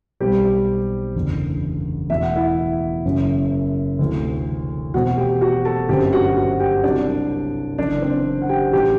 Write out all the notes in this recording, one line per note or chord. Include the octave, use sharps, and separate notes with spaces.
B1 B2 G3 C4 G4
F#1 E2 D3
E1 E2 B2 A3 E5
F#5
E4 E5
F#1 F#2 F#3
D2 C3 E3 A3
E1 E2 B2 A3 C4 F#4 F#5
G4 G5
F#4 F#5
A4 A5
G1 F#2 D3 A3 C4 G4 G5
F#4 F#5
F#4 F#5
G4 G5
C2 C3 F#3 D4 D5
F#1 F#2 E3 D4 D5
C4 C5
F#5
G4 G5
A1 F#3 A3 G4 G5